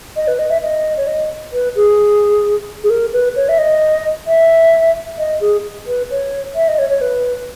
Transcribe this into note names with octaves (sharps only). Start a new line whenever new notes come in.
D#5
B4
D#5
E5
D#5
C#5
D#5
B4
G#4
G#4
A#4
B4
C#5
E5
D#5
E5
D#5
G#4
B4
C#5
E5
D#5
C#5
C#5
B4